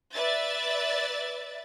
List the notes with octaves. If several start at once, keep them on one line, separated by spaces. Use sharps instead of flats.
B4 D5 E5 A6